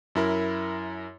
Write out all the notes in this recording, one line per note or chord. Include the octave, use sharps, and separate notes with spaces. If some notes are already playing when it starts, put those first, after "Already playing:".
F#2 E4 A#4